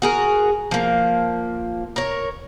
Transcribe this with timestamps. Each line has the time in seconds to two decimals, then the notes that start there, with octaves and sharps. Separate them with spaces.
0.02 F#4 G#4 A#4
0.71 F3 A#3
1.96 A#4 C#5